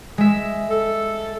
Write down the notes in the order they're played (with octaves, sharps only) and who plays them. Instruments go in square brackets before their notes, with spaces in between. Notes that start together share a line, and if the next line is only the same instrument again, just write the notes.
[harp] G#3 E5
[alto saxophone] A4